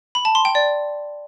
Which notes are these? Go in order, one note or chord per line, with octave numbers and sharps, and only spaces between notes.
B5
A5
C6
G5
D5